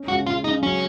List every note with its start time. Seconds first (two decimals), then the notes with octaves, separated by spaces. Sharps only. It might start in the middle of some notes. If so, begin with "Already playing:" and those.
Already playing: C#4
0.08 C#2 F#4
0.27 G#3 F4
0.44 C#3 D#4
0.62 F#3 C#4